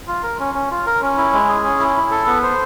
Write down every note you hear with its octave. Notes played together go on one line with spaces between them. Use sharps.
F4
A#4
C#4
C#4
F4
A#4
C#4
E4
G#3
G#4
C#4
E4
E4
A4
B3
C5